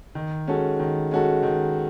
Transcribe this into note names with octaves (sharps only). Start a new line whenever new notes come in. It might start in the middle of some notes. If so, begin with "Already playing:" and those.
D#3
G#3 C#4 F#4 A4
D#3
G#3 C#4 F#4 A4
D#3